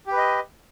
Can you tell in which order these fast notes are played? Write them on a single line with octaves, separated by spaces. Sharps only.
G4 B4 D#5